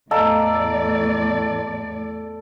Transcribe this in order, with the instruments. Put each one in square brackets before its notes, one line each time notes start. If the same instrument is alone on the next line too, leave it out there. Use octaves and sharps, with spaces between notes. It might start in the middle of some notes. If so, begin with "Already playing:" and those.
[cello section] E2 A2 D5 [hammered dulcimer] A4 [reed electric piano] D#5 F5 A#5